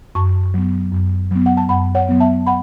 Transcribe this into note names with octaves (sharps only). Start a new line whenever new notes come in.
F#2 A5 C#6
F#3 B3
F#2
F#3 B3
F#5
A5
F#2 F#5 B5
C#5 F#5
F#3 B3
E5 A5
F#5 B5